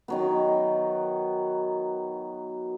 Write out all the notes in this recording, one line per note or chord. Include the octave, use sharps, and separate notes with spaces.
D#3 F#3 B3